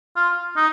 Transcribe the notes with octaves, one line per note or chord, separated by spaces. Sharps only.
F4
D#4